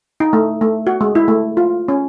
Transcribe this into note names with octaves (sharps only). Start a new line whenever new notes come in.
D#4
A3
A3
F#4
G#3
E4
A3
F4
C#4